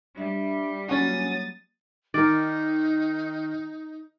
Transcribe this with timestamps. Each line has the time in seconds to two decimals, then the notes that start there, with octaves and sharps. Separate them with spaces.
0.17 G3 D4 E5
0.89 F#3 A#3 C#4 F#4 D#6 A6
2.14 D#3 D#4 A#4 D5